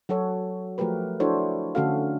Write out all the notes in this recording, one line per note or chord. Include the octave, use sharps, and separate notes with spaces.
F#3 F#4 A4 C#5
F3 A3 F#4 G4 A#4 B4
D4 E4 F#4 A4 C5 C#5
D3 A3 C#4 F#4 A4 F5